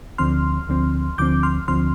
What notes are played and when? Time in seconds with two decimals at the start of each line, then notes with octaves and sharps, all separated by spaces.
0.18 D2 D3 F3 C4 C6 F6
0.69 D2 D3 F3 C4
1.18 D2 D3 F3 C4 D6 G6
1.43 C6 F6
1.68 D2 D3 F3 C4 C6 F6